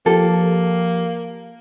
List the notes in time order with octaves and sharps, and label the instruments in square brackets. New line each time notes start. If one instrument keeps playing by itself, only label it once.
[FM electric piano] F3 G4 [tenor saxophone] A#3 [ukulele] A4